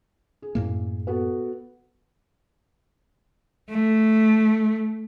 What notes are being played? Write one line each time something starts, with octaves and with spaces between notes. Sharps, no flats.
G#4
F#2 A2 A#3
B3 F#4 A4
A3